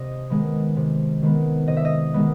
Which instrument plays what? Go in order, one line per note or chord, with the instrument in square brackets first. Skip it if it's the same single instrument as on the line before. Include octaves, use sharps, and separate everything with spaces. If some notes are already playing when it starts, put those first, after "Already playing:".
Already playing: [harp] C3 D#5
D#3 G#3 B3
C3
D#3 G#3 B3
C3 D#5
E5
D#5
D#3 G#3 B3